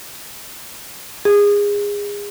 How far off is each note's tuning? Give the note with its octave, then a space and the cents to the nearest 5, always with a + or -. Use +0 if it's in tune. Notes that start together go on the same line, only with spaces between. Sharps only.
G#4 -25